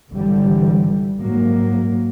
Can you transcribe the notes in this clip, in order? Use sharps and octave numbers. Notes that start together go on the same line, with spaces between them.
G#1 D3 E3 G3
G#2 F#3 A#3